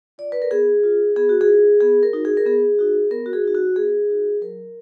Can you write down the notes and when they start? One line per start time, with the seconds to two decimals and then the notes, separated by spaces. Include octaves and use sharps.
0.18 F4 D5
0.32 B4
0.42 A#4
0.51 B3 G#4
0.84 F4
1.16 B3 G#4
1.29 F#4
1.41 G#4
1.48 F4
1.81 B3 G#4
2.03 A#4
2.13 D#4 F#4
2.25 G#4
2.37 A#4
2.46 B3 G#4
2.79 D#4 F#4
3.11 B3 A#4
3.26 F#4
3.33 G#4
3.44 D#4 F#4
3.54 F#4
3.76 B3 G#4
4.09 D#4 F#4
4.41 F#3 A#4